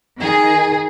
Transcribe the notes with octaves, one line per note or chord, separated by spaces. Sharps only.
D#3 G#4